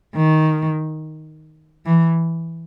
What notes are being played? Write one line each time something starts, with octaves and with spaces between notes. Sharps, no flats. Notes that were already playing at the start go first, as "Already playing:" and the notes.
D#3
E3